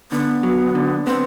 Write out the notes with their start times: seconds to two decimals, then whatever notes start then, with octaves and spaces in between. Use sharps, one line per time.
0.11 D3 B3
0.43 F#3
0.75 D3
1.06 B3 C4